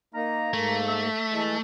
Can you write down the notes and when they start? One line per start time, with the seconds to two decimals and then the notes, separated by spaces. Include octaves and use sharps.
0.14 A#3 D#4 A#5
0.53 G#2 A3 A#3
0.88 E5
1.31 E3 G#3 A5